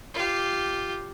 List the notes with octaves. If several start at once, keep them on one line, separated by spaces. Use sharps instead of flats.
F4 G4